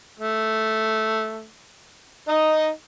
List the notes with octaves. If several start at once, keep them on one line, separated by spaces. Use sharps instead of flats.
A3
D#4 D#5